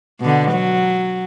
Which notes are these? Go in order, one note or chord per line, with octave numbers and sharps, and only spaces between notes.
B2 D3
F#3